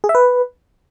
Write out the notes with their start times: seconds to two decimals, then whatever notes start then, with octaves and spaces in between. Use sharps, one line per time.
0.04 G#4
0.09 E5
0.15 B4